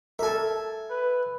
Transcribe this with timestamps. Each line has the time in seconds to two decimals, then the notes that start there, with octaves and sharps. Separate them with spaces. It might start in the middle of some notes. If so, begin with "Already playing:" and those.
0.19 A4 A#4 E5 G#5
0.90 B4